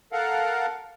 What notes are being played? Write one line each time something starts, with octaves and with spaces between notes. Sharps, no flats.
A4 A#4 F5 F#5